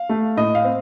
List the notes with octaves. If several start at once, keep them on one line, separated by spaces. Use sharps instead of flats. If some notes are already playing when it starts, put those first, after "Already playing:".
Already playing: F5
A3
A2 D#5
F5
C4